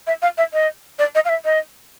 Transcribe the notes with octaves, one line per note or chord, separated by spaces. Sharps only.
E5
F5
E5
D#5
D5
D#5
F5
E5
D#5